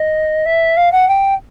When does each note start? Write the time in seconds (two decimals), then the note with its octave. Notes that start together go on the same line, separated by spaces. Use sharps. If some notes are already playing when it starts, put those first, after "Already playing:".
Already playing: D#5
0.46 E5
0.77 F5
0.92 F#5
1.08 G5